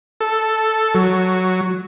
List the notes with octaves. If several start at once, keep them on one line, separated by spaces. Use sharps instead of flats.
A4
F#3